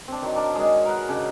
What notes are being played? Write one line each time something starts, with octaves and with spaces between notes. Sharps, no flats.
C4 D4
D#3 F#3 D6
D4 A#4
D#3 F#3 G#3 G#4
A#4 B4 F#5
C#3 D4 D#4